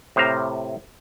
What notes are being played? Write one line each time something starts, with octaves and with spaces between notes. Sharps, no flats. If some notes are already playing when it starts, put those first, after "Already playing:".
A2 C3 C5 F5 A#5